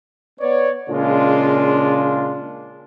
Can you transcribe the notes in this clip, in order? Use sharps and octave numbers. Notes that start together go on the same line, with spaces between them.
B3 C#5 D5
A#2 C#3 G#3 D4 F4